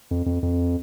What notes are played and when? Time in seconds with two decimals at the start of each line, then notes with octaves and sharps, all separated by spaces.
0.11 F2
0.26 F2
0.43 F2